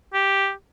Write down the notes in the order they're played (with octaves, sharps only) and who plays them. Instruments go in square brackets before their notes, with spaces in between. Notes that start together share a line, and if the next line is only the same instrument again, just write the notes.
[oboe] G4